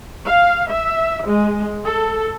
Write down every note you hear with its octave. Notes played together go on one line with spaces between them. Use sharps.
F5
E5
G#3
A4